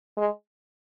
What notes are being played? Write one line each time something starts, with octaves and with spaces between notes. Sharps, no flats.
G#3